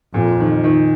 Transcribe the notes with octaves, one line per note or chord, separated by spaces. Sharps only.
F2 A#2
D#3
D#3